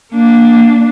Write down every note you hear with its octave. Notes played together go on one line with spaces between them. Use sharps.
A#3 D4